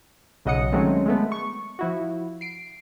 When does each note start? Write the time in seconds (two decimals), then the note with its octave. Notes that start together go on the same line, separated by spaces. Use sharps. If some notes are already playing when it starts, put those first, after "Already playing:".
0.45 B1 C#3 D#5 F#5 D#6 C#7
0.72 D#3 F#3 G#3 A3 C4 C#4
1.06 G#3 A3 B3
1.32 C#6
1.79 F3 E4 F#4
2.41 C7 D7